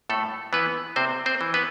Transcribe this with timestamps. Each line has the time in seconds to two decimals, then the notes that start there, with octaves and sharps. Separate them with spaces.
0.10 A2 A3 A4
0.53 E3 B3 B4
0.96 C3 C4 C5
1.26 C4 C5
1.41 E3
1.54 B3 B4